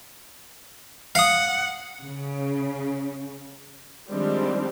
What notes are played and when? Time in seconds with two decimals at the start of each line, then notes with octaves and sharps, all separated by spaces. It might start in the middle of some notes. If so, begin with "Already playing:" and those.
1.15 F5 F#5 D#6
2.06 C#3
4.09 D#3 F3 G3 G#3 C4 D4